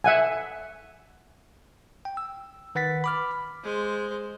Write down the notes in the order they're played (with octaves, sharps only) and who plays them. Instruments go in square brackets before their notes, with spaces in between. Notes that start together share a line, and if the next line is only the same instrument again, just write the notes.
[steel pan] E5 F#5 G#5
[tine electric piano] G5
E6
D#3 B4 F#5 A6 B6
B5 D6 F6
[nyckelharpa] G#3 C5